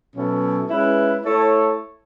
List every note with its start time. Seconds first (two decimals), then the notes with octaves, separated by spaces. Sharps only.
0.16 B2 F#3 C#4 E4 A4
0.70 G#3 C#4 E4 B4
1.24 A3 E4 A4 C#5